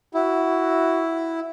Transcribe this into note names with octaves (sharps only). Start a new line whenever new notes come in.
E4 F#4